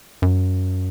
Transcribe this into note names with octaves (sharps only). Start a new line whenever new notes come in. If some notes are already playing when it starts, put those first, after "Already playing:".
F#2